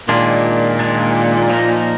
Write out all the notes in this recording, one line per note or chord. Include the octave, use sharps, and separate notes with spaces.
A#2 D#3 G#3 D4
D#3 G#3 D4
F3 A#3 D#4 A#4